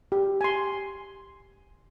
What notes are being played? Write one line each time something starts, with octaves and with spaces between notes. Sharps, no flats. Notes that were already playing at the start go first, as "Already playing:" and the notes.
G4
G#5 C6